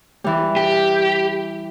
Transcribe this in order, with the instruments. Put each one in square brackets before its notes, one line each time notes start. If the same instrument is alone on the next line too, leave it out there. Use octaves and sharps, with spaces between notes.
[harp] E3 G3
[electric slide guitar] G4